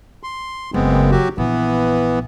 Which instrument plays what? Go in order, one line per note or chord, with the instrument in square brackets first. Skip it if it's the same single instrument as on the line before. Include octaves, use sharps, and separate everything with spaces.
[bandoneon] C6
[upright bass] F#1 [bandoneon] G#3 B3 C4
[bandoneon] F#3 F#4 G4
[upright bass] A#1 [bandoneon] E3 B3